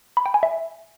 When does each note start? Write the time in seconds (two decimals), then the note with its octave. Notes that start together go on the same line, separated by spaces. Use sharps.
0.17 B5
0.26 G5
0.34 G#5
0.43 E5